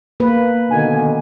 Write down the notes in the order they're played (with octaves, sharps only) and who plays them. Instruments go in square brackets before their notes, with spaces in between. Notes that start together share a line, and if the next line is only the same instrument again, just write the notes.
[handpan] A#3 B4
[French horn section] B2 D3 D#3 [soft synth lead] G#5